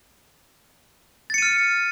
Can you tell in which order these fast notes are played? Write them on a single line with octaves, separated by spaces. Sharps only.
A6 C#7 D#7 F6